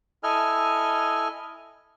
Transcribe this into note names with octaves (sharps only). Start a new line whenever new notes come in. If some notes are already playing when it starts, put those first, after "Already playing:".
E4 A4 D#5 G#5 F6